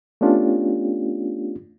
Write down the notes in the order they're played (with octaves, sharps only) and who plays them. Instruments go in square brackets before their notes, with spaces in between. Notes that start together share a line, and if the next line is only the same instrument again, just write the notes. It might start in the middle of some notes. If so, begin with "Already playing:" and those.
[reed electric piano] A3 B3 C#4 D4 F4 G4